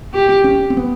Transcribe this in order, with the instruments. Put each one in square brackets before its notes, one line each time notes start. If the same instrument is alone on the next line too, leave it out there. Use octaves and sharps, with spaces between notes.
[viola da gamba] G4
[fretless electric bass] C#4
C4
B3